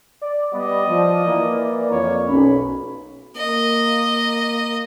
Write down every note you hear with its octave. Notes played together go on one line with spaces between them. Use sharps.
D5
G3 B3 D#5
F3
E3 A#3
F2 A#3 C#5
B1 C#4 B5
A#3 D#5